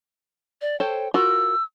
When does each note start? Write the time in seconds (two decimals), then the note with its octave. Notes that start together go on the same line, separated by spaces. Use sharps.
0.61 D5
0.80 A4 C5 C#5 G5
1.14 F4 F#4 A#4 E6